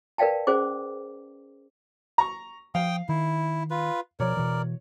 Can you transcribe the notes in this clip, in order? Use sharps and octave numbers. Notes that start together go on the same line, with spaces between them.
A#4 B4 D5 F5 G5 A5
C#4 G#4 C5 D6
A#5 C#6
F3 F5 G5 D#6
D#3 E4
F4 B4
B2 F3 A#4 C#5 D5
B2 E3